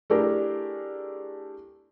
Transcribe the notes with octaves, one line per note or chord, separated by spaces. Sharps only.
A3 D4 E4 G4 G#4 A#4